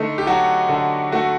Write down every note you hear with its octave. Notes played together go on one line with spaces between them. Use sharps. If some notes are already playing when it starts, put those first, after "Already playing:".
Already playing: D3 A3 D#4
G4
F#3 F#4
D3
A3 F#4